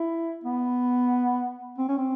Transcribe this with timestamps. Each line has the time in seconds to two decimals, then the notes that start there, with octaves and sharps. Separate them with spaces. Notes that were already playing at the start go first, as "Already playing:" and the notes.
Already playing: E4
0.44 B3
1.78 C4
1.88 C#4
1.98 C4